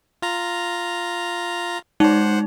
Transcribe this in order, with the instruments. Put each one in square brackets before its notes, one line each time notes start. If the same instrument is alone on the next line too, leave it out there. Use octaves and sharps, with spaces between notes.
[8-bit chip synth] F4 A#5
[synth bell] G#3 D#4 [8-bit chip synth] C5 F#5